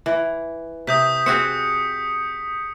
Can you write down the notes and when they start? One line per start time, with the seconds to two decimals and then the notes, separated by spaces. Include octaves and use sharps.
0.06 E3
0.87 C3 D#6 G6 B6
1.26 C4 F#4 G#4 C#7